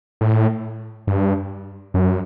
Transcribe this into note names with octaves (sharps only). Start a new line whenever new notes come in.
A2
G2
F#2